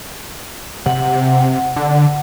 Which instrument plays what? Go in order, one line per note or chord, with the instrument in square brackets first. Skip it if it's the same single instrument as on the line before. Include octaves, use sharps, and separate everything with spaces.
[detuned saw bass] C3 [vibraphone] F#5
[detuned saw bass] D3